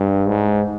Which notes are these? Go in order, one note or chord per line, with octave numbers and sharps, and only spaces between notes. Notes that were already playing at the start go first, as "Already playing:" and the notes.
Already playing: G2
G#2